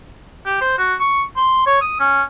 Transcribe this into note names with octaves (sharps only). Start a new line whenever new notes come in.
G4
C5
F#4
C#6
C6
C#5
D#6
C#4